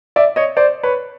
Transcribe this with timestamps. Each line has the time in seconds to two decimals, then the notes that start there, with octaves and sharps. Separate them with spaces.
0.16 D5 E5
0.36 C#5 D#5
0.57 C5 D5
0.83 B4 C#5